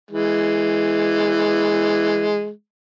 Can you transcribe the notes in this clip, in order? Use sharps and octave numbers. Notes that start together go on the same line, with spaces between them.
E3 G#3